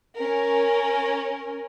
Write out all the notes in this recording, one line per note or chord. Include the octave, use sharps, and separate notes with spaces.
C#4 A#4